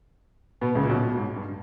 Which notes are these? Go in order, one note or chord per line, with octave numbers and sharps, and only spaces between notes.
B2 B3
C#2 C#3
A#2
B1 B2
B1 B2
G#2
G2